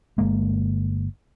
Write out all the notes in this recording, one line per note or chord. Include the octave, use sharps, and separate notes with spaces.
G1 G#3 A#3